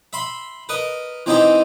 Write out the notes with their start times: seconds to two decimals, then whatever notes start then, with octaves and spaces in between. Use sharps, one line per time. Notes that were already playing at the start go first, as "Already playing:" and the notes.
0.13 E5 B5 C6
0.69 A#4 B4 D#5
1.26 E3 C4 D#4 E4 G4 G#4